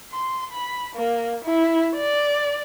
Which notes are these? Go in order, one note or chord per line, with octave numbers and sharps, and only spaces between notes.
C6
B5
A#3
E4
D5